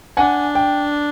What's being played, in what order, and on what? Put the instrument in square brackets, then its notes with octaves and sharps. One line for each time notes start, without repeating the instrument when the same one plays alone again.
[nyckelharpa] D4 [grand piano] F#5 G#5
[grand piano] G5